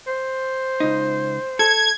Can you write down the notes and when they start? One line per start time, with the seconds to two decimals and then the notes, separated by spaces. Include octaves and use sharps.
0.07 C5
0.80 C#2 D#4
1.59 A4 G#6